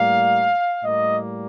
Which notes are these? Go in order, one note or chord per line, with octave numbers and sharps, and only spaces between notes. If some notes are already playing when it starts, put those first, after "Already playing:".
Already playing: A2 G3 A#3 F5
A2 G3 A#3 D#5